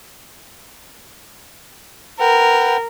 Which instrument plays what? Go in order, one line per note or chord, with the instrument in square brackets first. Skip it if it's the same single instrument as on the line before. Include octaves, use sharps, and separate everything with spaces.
[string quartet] A#4 [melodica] B4 F#5 G5